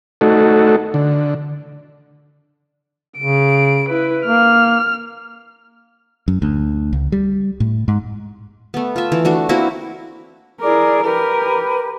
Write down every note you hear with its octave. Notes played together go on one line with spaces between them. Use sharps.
A3 D#4 F#4 A4
D3
C#3 D7
E4 B4
A#3 F6
F#2
D2
C#2
G3
A2
G#2
A3 B3
F4 E5
E3
A3 D4 F#4
A#3 C4 E4 F#4
E4 G#4 A#4 D5 D6
G4 A#4 B4